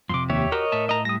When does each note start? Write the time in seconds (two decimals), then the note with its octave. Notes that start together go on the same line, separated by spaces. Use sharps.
0.09 F2 A2 C3 C6 D6
0.30 D#2 G4 C#5 E5
0.52 F#4 G4 A#4 C#5 D#5
0.72 A2 E5 A5
0.89 D#5 A#5
1.05 G3 D#6 A#6